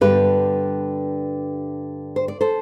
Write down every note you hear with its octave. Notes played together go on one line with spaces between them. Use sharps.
G2 D3 G3 B3 G4 B4
C5
D5
A4 C5